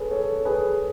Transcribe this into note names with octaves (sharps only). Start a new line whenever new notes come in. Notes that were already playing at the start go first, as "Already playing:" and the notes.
Already playing: G#4 A4 B4 C#5
A4 C#5
G#4 B4